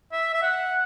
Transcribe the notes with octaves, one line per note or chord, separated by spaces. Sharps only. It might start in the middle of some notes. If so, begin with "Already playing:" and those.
E5
E5
F#5